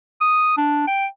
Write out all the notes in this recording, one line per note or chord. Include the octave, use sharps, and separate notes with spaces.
D#6
D4
G5